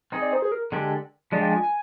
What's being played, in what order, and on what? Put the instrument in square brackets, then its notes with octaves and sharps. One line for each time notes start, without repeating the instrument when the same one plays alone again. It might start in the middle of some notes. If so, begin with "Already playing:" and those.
[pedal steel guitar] C4 D#4 G#4 [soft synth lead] D#5
[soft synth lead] D5
C5
G#4
A#4
[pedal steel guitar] D3 G#3 D4 G4
[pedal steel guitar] F3 G#3 D4 F4 [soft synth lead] D5
[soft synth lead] G5
G#5
G#5